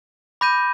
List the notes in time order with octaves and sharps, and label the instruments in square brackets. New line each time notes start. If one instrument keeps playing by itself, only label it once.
[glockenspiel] B5 D6 G6 A#6 D#7